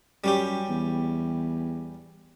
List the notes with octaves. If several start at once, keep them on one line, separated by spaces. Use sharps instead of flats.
F#2 G3 C#4 G4
E2